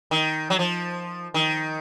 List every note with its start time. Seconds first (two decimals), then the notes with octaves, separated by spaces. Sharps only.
0.11 D#3
0.50 F#3
0.59 F3
1.34 D#3